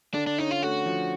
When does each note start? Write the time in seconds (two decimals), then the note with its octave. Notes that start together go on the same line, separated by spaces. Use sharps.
0.14 D3 D4
0.27 D4
0.38 C#4 D#4
0.51 F4
0.63 A3 F#4
0.86 F3